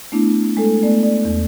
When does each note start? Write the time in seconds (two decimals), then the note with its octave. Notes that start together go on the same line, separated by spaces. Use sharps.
0.12 A3 B3 D4 E4
0.57 G#3 A3 A4
0.83 A3 B3 D5
1.03 D5
1.25 E2